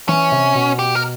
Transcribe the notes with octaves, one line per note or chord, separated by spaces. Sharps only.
E3 C#4
C3
B2
G4
A#4